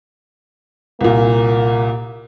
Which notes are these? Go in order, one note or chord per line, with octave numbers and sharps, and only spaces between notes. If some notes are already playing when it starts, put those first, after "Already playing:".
C2 A#2 A#3